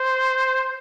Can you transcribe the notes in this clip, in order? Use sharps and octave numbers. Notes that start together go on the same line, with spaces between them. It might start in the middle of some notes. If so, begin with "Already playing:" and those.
Already playing: C5